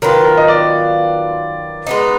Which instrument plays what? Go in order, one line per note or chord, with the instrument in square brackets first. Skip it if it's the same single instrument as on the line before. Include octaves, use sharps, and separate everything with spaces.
[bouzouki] D#3 F#3 B3 F4 [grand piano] A#4
[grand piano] A#4
D#5
D5
[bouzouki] G#3 B3 D#4